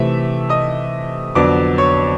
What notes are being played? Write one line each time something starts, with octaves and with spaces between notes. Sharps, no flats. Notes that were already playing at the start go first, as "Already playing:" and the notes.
Already playing: C3 E3 A3 E5
D#5 D#6
F2 D3 F#3 B3 D5 D6
C#5 C#6